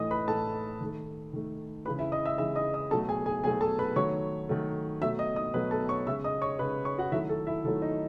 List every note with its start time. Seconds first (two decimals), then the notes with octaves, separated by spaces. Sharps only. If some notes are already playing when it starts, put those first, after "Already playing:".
Already playing: A2 E3 A3 D#5 D#6
0.11 B4 B5
0.28 A2 E3 A3 A4 A5
0.80 D#3 A3
1.33 D#3 A3
1.85 C#3 E3 G#3 B4 B5
1.99 E4 E5
2.12 D#5 D#6
2.25 E5 E6
2.38 C#3 E3 G#3 E5 E6
2.56 D#5 D#6
2.74 D#5 D#6
2.91 B2 F#3 A3 A4 A5
3.09 G#4 G#5
3.26 G#4 G#5
3.44 B2 F#3 A3 G#4 G#5
3.61 A4 A5
3.79 B4 B5
3.96 D#3 F#3 A3 C#5 C#6
4.49 D#3 F#3 A3
5.01 B2 F#3 A3 E5 E6
5.19 D#5 D#6
5.36 D#5 D#6
5.54 B2 F#3 A3 B4 B5
5.71 A4 A5
5.89 C#5 C#6
6.06 C#3 G#3 E5 E6
6.24 D#5 D#6
6.42 C#5 C#6
6.59 C#3 G#3 B4 B5
6.85 C#5 C#6
6.98 F#4 F#5
7.12 D#3 F#3 A3 E4 E5
7.29 A4
7.47 E4 E5
7.65 D#3 F#3 A3 A4
7.82 D#4 D#5